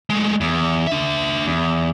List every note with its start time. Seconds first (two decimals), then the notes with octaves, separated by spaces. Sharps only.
0.10 G#3 A3
0.41 E2
0.87 D4 E5
1.47 E2